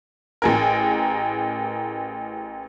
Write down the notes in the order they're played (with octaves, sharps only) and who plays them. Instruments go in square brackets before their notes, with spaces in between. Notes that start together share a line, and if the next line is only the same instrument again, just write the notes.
[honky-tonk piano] A1 G#4 A#4